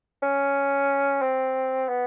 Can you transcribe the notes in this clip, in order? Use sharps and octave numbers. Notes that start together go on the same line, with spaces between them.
C#4
C4
B3